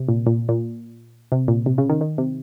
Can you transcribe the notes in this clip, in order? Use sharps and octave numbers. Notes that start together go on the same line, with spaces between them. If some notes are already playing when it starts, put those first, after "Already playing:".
Already playing: C3
A#2
A#2
A#2
C3
A#2
C3
C#3
D#3
D#3
C3